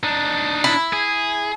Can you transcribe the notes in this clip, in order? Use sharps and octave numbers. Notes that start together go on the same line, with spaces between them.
D4 D#4
E4
G#4